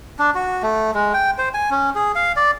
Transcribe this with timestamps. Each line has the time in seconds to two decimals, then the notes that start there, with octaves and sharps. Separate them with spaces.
0.19 D4
0.35 F#4
0.63 A3
0.95 G#3
1.14 G5
1.38 C5
1.54 G#5
1.71 C#4
1.95 G#4
2.15 F5
2.36 D5